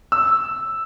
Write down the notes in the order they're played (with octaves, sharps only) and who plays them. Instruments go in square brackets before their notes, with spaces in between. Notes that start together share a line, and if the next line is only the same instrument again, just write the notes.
[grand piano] E6